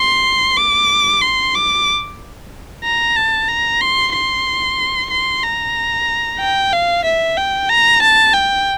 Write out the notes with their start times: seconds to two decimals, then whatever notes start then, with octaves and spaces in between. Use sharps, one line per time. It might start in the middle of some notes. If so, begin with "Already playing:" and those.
Already playing: C6
0.57 D6
1.22 C6
1.55 D6
2.84 A#5
3.16 A5
3.48 A#5
3.81 C6
4.14 C6
5.10 C6
5.43 A#5
6.40 G5
6.73 F5
7.05 E5
7.37 G5
7.69 A#5
8.02 A5
8.34 G5